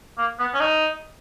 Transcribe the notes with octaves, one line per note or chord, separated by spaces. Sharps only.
A#3
B3
C#4
D#4